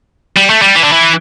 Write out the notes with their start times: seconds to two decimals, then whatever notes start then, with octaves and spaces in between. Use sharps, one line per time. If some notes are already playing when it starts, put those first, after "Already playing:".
0.37 G3
0.50 A3
0.62 G3
0.76 E3
0.84 D3
0.92 E3